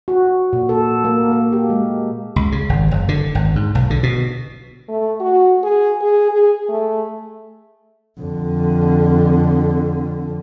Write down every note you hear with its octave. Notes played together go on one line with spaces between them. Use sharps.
F#4
A#2
A4
A#3
A#3
G4
G#3
C#2
C#3
G#1
F#1
D3
G#1
G#2
B1
D3
B2
A3
F#4
G#4
G#4
G#4
A3
F2 D3